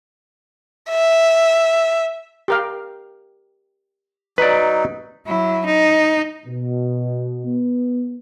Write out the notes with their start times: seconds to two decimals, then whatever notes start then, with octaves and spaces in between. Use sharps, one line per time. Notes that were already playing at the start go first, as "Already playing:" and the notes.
0.90 E5
2.48 G4 A#4 F5
4.38 F#3 D#4 B4 D5
5.26 F#3 E4
5.66 D#4
6.46 B2
7.45 B3